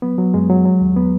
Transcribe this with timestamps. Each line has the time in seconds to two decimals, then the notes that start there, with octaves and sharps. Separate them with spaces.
0.02 F#3 B3
0.18 F#3
0.34 F#2 G#3
0.50 F#3
0.65 F#3
0.81 D#2
0.96 B3